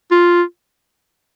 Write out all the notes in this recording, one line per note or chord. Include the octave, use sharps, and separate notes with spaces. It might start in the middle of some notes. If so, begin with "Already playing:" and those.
F4